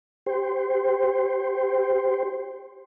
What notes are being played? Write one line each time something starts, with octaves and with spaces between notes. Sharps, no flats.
G4 C5